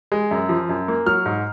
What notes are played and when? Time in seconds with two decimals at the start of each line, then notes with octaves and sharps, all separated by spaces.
0.12 G#3
0.31 F#2
0.49 F3
0.69 F#2
0.88 A#3
1.06 F#3 F6
1.26 G#2